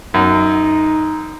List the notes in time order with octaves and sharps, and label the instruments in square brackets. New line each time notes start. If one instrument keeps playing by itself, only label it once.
[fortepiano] F#2 [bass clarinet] D#4